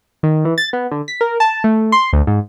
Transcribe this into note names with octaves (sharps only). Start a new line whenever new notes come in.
D#3
E3
A6
B3
D3
B6
A#4
A5
A3
C6
D2
G#2